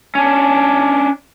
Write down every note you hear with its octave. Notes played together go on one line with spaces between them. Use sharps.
C#4 D4